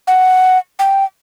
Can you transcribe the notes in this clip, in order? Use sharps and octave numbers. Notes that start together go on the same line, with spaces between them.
F#5
G5